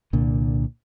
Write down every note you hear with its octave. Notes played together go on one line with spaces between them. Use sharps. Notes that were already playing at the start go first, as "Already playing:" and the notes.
C2 A#2 D3